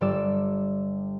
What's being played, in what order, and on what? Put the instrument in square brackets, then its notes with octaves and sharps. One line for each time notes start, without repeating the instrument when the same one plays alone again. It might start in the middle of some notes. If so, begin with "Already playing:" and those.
[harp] G1 G3 D5 E6